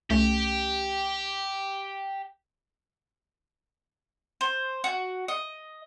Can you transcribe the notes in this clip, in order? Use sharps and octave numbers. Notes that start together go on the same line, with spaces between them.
C2 A3 C#4 G4
C5
F#4
D#5